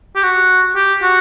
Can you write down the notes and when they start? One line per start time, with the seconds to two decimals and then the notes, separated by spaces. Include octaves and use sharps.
0.16 G4
0.23 F#4
0.76 G4
1.03 F#4